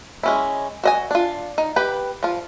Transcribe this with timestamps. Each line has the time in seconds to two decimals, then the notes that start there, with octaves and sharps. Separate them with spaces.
0.23 G#3 C#4 E4
0.84 F#4 D#5 G#5
1.11 D4 F4
1.58 D#4
1.76 G4 B4
2.23 F3 F4